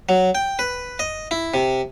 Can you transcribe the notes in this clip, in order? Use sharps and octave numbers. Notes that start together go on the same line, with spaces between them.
F#3
G5
B4
D#5
E4
C3